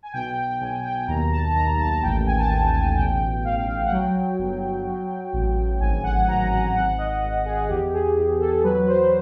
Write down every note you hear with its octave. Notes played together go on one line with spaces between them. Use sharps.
G#5
B1 G5
G5
B1 G#5
G5
D#2 A#5
A5
D#2 A#5
A5
A1 G5
G#5
A5
A1 G#5
G#5
B1 G5
B1 F5
F5
F#5
F#3 G5
G1
F#3
A1
G#1 G#5
F#5
G#1 A#5
F#5
G#1 F#5
D#5
G#1
G#4
E2 G4
G#4
E2
A4
F#3 B4
C5